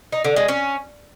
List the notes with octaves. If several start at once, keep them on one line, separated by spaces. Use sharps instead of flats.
D#4
D3
G#3
C#4